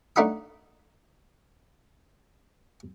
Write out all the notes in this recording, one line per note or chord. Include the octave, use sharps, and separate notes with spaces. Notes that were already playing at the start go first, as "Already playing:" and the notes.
A3 D4 D#4 F#4 B5 D#6